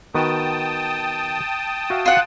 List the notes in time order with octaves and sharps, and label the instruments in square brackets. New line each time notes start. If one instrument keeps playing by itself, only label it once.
[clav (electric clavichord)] D#3 B3 F#4 [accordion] G5 A5 D#6
[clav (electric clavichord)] F#4 E5 F5
[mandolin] F4 F#5